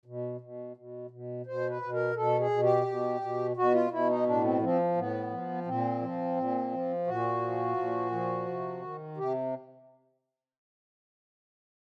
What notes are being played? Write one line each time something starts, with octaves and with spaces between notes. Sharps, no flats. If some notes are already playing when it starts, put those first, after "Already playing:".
B2
B2
B2
B2
B2 C5
B4
B2
A#4
B2 A4
G#4
B2
G4
B2
B2
B2 F#4
F4
B2 E4
D#4
A2 D4
C4
F3 C4
A2 B3
F3
A#2 C4
F3
A#2
F3
A#2 F#4
F3
A#2
F3
C3
D#3
C3 G4